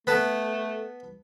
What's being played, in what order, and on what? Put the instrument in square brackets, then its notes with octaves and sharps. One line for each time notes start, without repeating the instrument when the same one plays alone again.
[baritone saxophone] A3 [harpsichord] B3 B4 A5